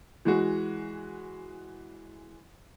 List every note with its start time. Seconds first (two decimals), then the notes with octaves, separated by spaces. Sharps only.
0.25 E3 G#3 F#4